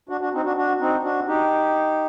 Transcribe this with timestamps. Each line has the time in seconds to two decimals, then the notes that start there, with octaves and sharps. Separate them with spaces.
0.09 D4 F#4
0.21 D4 F#4
0.33 C4 D#4
0.45 D4 F#4
0.56 D4 F#4
0.80 C4 D#4
1.04 D4 F#4
1.27 D#4 G4